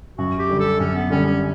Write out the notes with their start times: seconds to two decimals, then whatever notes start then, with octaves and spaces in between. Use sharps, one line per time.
0.18 F#2 F#4
0.39 G4
0.49 D3 G3
0.60 A4
0.80 F#2 C#4
0.95 B3
1.10 D3 G3 C#4
1.26 C#4